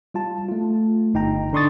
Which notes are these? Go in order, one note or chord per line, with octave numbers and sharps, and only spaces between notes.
G3 F4 A5
A3 F4
G1 D#4 G5 A#5
D3 D4 C6 C#6 D#6 A6